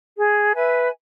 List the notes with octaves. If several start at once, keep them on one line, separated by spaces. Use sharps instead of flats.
G#4
B4 E5 G#5